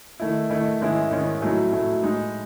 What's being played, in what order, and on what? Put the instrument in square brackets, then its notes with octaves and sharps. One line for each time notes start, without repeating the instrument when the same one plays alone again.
[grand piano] D#3 A3 E4
D#3 A3 E4
G#2 D#3 G#3 C#4 E4
G#2 D#3 G#3 C#4 E4
A2 F#3 A3 E4
A2 F#3 A3 E4
A2 G#3 D#4